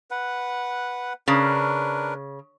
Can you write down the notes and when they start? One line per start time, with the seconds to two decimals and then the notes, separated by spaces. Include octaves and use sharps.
0.11 B4 F#5
1.28 C#3 D4 A#4 B4